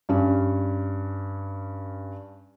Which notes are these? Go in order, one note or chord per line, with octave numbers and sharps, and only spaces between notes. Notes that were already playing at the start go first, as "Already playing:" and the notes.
G2 C#4